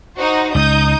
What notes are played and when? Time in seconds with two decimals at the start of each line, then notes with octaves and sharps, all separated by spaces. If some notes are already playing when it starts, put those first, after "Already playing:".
0.18 D#4 F#4 C5
0.55 C#2 D#4 D#6 G6